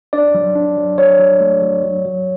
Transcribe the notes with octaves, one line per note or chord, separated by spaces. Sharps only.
D4 D5
F#3
D4
F#3
F#3 C#5
F#3
A3
F#3
F#3
F#3